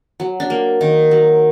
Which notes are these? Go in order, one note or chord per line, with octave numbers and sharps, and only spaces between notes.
F#3
D4
A#3
D#3
F#3